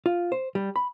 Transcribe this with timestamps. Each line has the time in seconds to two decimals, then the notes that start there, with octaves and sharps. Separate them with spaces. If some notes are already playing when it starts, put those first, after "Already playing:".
0.06 F4
0.32 C5
0.55 G3
0.76 B5